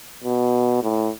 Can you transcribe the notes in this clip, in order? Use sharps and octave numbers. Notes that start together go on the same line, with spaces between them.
B2
A2